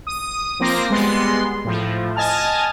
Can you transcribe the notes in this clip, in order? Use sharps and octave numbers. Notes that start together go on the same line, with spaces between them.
D#6
F3 A#3 C4 D6 A#6 C7
G3 G#3 B3 C6
A2 F3
D#5 G#5 A5 F6